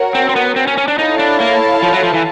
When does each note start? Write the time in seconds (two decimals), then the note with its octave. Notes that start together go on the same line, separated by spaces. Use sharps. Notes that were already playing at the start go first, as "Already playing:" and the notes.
Already playing: F#4 A#4 C#5 F#5
0.15 C4
0.29 C4
0.36 B3
0.56 C4
0.67 C#4
0.78 C#4
0.88 D4
0.98 D#4 E4 A4 C#5 F5 A5
1.19 D4
1.40 A#3
1.82 F3
1.93 F#3
2.03 F3
2.14 E3